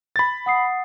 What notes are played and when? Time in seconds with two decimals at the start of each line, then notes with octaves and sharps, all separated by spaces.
0.16 B5 A6
0.46 F#5 D#6 C7